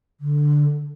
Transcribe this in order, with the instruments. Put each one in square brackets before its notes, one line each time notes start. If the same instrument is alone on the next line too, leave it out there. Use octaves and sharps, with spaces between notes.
[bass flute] D3